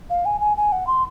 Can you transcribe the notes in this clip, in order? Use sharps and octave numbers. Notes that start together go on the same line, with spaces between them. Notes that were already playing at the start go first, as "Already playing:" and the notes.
F5
G#5
G#5
G#5
F#5
C6